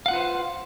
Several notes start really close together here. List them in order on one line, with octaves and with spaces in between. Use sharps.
F5 F#5 F4 B4 C5